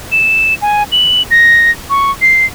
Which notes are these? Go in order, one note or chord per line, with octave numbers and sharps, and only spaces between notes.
E7
G#5
F#7
A#6
C#6
C7